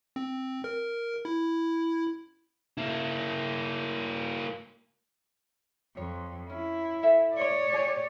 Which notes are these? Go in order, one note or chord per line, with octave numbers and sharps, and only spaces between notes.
C4
A#4
E4
A#3 E4
F2 C#5
C#4 E4
A4 E5
C#5 D5
G4 G#4 G#5